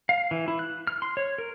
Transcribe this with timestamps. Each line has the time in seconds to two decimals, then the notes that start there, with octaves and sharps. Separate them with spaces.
0.09 F5
0.31 E3
0.48 E4
0.59 F#6
0.87 F6
1.02 C6
1.17 C#5
1.38 A#4